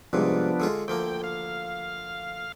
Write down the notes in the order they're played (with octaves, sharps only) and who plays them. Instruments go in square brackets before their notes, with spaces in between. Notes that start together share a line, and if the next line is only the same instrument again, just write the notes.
[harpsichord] C2 G#2 C3 [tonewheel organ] F3 B3 D4
[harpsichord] D3 G#3 F4
[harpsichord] D2 F3 A#3 [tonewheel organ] G5
[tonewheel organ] F5